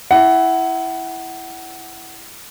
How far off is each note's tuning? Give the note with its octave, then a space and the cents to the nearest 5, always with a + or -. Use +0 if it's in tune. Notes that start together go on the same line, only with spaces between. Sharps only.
E4 +0 F#5 +20